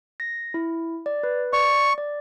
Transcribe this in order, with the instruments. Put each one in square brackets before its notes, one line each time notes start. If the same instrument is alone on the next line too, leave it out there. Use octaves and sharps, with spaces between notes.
[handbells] A#6
E4
D5
B4
[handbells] D5 [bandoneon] C#6
[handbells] D5